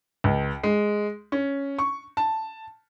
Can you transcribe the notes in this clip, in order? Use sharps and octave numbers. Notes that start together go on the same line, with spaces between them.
C#2
G#3
C#4
C#6
A5